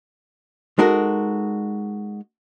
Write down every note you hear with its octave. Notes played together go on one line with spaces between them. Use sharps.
G#3 D#4 F#4 A4 A#4